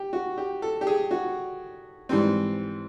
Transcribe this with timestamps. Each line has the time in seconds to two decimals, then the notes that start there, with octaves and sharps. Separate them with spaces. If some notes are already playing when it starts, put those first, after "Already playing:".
Already playing: G4
0.13 F#4
0.38 G4
0.62 A4
0.81 G4
0.87 G#4
1.11 F#4
2.09 G#2 E3 G3 C4